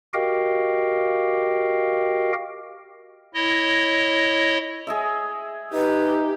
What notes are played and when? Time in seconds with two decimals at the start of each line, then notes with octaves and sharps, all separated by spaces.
0.14 F#4 G4 A#4 D#5 F5 G5
3.34 E4 C#5 D#5
4.87 G#4 D#5 E5
5.73 D#4 G4 B4